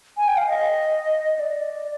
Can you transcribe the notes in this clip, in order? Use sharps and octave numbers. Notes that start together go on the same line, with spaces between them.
G#5
G5
F5
D#5
D#5
D5